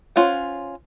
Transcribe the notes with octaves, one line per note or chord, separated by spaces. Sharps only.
C#4 F4 C5 F#5